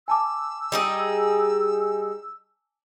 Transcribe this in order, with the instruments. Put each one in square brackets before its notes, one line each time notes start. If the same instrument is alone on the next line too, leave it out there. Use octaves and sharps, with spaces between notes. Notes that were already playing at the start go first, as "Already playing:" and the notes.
[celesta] G#5 A5 D6 [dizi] E6
[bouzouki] G3 D#4 G#4